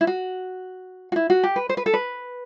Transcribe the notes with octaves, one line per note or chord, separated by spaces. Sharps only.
E4
F#4
F#4
E4
F#4
G4
B4
C5
B4
A4
B4